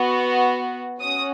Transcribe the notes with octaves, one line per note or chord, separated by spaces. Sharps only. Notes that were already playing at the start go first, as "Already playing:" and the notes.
Already playing: B3 F#4
C#4 F#4 D#6